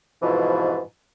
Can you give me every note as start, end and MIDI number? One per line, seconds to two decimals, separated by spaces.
0.22 0.79 41
0.22 0.79 44
0.22 0.79 47
0.22 0.79 52
0.22 0.79 53